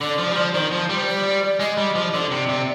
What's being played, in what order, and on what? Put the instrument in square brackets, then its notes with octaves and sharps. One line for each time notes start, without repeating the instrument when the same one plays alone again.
[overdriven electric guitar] D3 [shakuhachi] D5
[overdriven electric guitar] F3
G3
F3
[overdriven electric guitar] D#3 [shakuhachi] C5
[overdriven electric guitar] F3
G3
[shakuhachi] D5
[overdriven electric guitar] G#3 [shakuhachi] D#5
[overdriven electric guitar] G3
F3
[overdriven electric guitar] D3 [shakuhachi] D5
[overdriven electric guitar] C3
C3